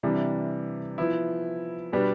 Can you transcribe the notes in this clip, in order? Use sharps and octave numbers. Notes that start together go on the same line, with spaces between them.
C3 E3 G3 D4
F3 B3 E4
B2 G3 B3 D4 G4